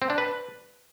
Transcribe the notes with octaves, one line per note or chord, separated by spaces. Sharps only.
C4
D4
B4